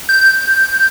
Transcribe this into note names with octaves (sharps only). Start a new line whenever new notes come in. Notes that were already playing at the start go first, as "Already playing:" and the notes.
G6